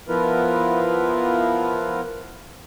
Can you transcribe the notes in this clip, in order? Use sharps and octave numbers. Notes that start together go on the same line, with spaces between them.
F3 B3 E4 F4 A#4 B4